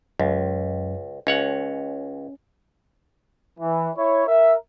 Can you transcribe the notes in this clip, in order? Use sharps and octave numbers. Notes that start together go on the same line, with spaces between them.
C#2 F#2
C#2 C#4 C#5 F#5
E3
E4 C#5
A#4 E5